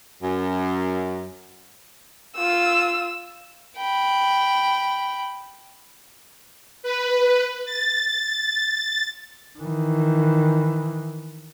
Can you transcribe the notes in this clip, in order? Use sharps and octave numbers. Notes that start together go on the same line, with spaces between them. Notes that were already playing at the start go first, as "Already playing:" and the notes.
F#2
F4 E6
G5 B5
B4
A6
D#3 E3